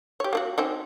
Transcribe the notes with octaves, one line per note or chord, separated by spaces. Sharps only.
G4 C#5
A#3 D4 F#4
C4 C#4 D#4